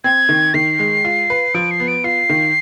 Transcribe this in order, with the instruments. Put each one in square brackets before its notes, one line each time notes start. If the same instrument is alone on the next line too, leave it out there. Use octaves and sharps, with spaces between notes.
[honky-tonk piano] C4 [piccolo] G#6
[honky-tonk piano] D#3
[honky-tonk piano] D#3 [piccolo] C7
[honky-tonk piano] G#3
F4
B4
[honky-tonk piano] F3 [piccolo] D7
[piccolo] C7
[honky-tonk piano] B3
[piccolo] D7
[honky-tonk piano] F4 [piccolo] C7
[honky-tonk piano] D#3